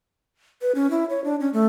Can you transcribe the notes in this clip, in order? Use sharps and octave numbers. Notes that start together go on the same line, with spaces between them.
B4
C#4
E4
C#5
D4
C#4
A3